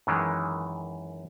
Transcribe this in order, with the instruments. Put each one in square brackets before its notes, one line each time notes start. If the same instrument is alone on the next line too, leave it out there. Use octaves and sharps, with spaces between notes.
[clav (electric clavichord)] F#2 D#3 E3 G#3